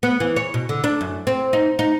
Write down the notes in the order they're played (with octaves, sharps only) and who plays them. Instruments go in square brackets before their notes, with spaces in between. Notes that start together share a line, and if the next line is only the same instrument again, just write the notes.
[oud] B3
E3
C#5
B2
D3
D4
F#2
C4
D#4
D#4